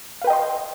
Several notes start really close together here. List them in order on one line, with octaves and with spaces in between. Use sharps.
F5 B4 G5 D#5 C6